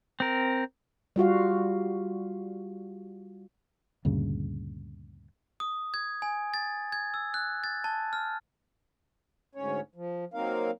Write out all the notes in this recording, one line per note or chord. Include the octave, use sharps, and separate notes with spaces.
C4 A#4
G3 F4 F#4 F5
D2 G2 A#2 C#3
D#6
G#6
G#5
A6
G#6
E6
F#6
A6
A5
F6
D2 G#2 C#4 C#5
F3
F#3 A#3 C4 D#4 A#4 F5